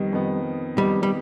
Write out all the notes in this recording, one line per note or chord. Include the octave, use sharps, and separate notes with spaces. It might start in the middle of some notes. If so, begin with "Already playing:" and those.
Already playing: F2 D#3 G3 B3
F2 D#3 B3
F2 D#3 G3 B3
G3